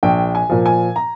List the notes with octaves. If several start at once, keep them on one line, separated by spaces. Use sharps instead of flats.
A#1 G5
G#5
A#2 F3
G#5
A#5